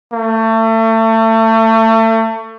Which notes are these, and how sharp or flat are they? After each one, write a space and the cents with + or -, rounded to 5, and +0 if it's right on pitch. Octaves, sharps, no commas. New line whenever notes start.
A3 +30